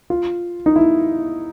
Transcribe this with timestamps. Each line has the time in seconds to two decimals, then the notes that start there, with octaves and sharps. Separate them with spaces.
0.10 F4
0.66 D#4
0.76 E4